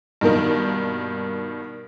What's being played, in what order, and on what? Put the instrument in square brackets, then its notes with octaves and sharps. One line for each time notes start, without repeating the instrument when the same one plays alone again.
[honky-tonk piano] G2 B2 D#3 A#3 D#4